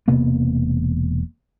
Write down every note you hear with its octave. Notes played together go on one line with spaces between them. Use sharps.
E1 C3 A#3 B3